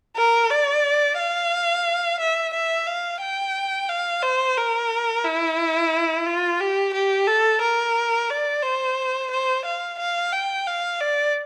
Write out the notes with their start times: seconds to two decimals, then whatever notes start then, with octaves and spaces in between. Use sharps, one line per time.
0.16 A#4
0.50 D5
1.18 F5
2.20 E5
2.54 E5
2.87 F5
3.21 G5
3.89 F5
4.23 C5
4.57 A#4
5.24 E4
6.26 F4
6.60 G4
6.94 G4
7.27 A4
7.62 A#4
8.30 D5
8.63 C5
9.31 C5
9.65 F5
9.99 F5
10.32 G5
10.67 F5
11.00 D5